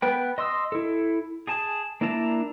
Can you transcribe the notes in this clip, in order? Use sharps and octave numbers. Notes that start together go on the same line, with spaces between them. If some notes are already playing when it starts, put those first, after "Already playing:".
B3 B4 G5
D#5 C6 D#6 E6
E4 A4
G#4 G#5 A5
A#3 D4 E4 A5 A#5